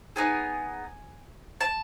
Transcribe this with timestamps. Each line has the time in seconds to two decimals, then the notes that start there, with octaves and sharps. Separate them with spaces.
0.16 B3 D#4 G#4 G#5
1.61 A5